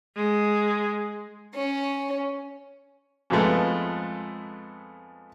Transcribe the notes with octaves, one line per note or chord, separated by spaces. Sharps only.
G#3
C#4
F2 G#2 F3 G#3 A3 B3